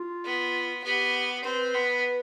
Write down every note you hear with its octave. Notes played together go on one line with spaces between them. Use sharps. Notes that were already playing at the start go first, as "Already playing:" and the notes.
Already playing: F4
B3
B3 G4
C4 B4
B3